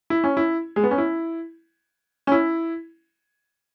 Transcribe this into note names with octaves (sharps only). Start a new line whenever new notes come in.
E4
C#4
E4
G#3
B3
C#4
E4
C#4
E4